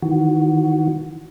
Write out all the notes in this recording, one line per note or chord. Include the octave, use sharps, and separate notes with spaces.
D#3 E3 F#4